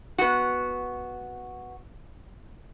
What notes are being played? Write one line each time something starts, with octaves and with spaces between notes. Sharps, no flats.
B3 F#4